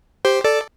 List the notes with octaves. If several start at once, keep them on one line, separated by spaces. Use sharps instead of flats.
G4 C5
A4 D5